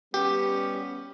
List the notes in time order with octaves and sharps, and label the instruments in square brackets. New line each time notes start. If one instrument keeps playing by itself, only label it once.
[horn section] G3 B3 C#4 [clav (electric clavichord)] G4